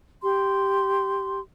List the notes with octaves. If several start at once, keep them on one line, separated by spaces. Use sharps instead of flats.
G4 C6